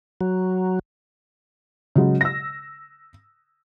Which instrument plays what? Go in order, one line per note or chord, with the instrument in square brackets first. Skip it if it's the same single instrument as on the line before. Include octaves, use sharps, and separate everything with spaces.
[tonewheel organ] F#3
[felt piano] C#3 F#3 G#3
E6 A#6